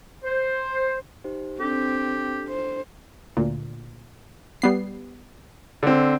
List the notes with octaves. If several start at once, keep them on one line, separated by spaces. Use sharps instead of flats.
C5
D#4 G4 C5
C4 D4 G4 A4
C5
D2 A#2
G3 B3 C7
D3 C4